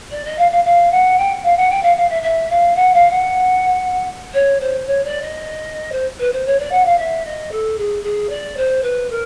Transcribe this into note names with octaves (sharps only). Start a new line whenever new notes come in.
D5
D#5
F5
F5
F5
F#5
G5
F5
F#5
G5
F5
F5
E5
E5
F5
F#5
F5
F#5
C#5
C5
C#5
D5
D#5
C5
B4
C5
C#5
D5
F#5
F5
E5
D#5
A4
G#4
G#4
D5
C5
B4
A#4